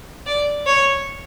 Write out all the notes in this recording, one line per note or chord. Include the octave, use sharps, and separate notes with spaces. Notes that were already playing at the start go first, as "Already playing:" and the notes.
D5
C#5